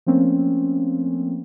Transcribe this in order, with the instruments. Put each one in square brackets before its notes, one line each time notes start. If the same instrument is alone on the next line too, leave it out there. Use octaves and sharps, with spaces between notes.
[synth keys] F3 A3 A#3 C4 C#4